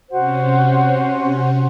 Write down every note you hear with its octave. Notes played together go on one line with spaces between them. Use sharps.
C3 C#4 F#4 C5 F#5